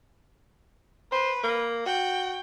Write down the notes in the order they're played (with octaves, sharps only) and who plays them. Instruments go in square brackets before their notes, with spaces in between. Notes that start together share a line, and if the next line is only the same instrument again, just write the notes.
[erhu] B4 [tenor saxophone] C5
[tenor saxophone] A#3
[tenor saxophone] F#4 [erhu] G5